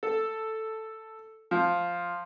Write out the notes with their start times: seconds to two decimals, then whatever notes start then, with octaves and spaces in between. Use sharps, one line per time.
0.03 A4
1.51 F3